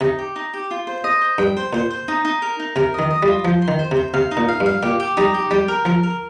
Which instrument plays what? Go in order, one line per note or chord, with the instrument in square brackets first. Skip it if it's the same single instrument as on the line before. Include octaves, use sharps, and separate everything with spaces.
[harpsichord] C3 [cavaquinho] D#4
[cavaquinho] G4
D#4
G4
F4
C5
D#5
C5
[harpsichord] G2 [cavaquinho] G5
[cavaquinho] C5
[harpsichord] A#2 [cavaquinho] C5
[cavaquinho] C5
D#4
D#4
A#4
D#4
[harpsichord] C3 [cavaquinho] A#4
[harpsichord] D#3 [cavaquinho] D#5
[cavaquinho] D#5
[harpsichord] G3
[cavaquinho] F4
[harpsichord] F3 [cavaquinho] C5
[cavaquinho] C6
[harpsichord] D#3
[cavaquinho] C5
[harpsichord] C3
[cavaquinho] C5
[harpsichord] C3 [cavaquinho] F5
[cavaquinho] D#4
[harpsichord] A#2
[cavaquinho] F5
[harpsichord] G2
[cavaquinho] F5
[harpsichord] A#2 [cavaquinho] G4
[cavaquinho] G4
[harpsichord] G3 [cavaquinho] D#4
[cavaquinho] G4
[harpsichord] G3 [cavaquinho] G5
[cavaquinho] A#4
[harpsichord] F3 [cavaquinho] A#4
[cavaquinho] A#4